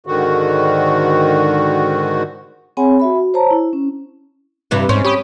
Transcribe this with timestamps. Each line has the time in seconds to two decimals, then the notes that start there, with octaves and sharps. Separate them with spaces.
0.07 G#2 D3 D#3 F#4
2.77 C4 G#4 C#5 F#5 G#5 B5
2.99 F#4 E5 B5
3.15 F#4
3.34 C5 C#5 A5 A#5
3.51 E4
3.73 C#4
4.71 G2 C3 E3
4.89 G#2 C#4 C5
5.05 G4 C#5 B5 D#6